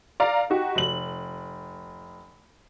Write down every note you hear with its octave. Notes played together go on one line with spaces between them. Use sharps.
D5 F5 A#5
D#4 F#4 G4
F1 F#7